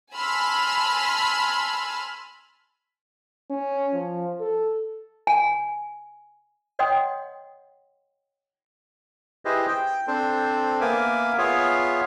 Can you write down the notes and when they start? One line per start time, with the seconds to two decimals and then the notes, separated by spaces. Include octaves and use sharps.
0.13 G#5 A5 B5 C6 E6 F6
3.50 C#4
3.93 F3
4.40 A4
5.27 G#5
6.79 C#5 D#5 F#5 G5 C6 D#6
9.45 E4 G4 G#4 B4 C5 D#5
9.68 G5
10.07 C4 D4 A4 C5
10.81 A#3 B3 A#4 E5 G#5 D6
11.38 B3 F4 G#4 C#5 E5 F5